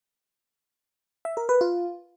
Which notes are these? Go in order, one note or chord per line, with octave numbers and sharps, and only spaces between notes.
E5
A#4
B4
F4